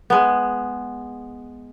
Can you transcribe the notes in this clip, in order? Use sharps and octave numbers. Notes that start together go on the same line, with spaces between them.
G#3 B3